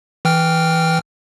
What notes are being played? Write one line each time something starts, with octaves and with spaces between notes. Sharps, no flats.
E3 G5 F6